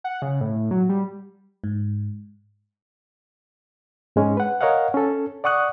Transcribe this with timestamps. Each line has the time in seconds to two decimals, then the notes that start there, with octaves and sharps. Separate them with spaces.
0.04 F#5
0.22 C#3
0.41 A2
0.71 F#3
0.89 G3
1.64 G#2
4.16 G#2 G#3 C#4
4.37 B4 F#5
4.61 A#4 C#5 D#5 F5 F#5
4.94 C#4 A4
5.44 D5 F#5 C#6 D#6 F#6